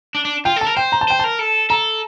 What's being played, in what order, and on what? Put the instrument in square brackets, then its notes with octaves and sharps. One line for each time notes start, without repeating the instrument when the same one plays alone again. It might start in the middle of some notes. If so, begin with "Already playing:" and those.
[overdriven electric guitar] D4
D4
[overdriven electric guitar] F4 [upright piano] G5
[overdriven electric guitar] A4 [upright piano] A5
[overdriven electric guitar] A#4
[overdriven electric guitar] C5 [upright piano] G5
[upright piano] A#5
A5
[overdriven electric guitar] C5 [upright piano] G5
[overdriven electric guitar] A#4 [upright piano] A5
[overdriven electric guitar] A4
[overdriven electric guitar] A4 [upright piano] A#5